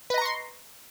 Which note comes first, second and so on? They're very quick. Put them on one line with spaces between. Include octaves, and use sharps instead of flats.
B4 D#5 A#5 C#6 C6